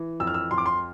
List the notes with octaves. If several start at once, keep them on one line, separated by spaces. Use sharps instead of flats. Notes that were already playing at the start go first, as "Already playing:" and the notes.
Already playing: E3
F2 E6
F6
E6
F2 C6
D6
C6